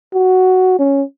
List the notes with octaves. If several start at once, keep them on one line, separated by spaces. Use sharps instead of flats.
F#4
C#4